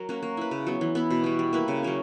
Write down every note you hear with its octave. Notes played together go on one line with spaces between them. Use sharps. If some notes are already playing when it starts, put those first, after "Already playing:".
Already playing: F#3 A#4
A#3 C#4 F#4
A#3
E4 B4
C#3
F#3 B3
E3
B3 E4
B2
G3 B3
G3
A#3 E4 B4
C#3
F#3 A#3 C#4